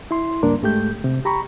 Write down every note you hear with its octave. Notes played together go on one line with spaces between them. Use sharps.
E4 C6
C#2 G2 A#3 D4 A#4
G#2 G#3 A3 G4 G6
C3
G4 A#5 B5 C#6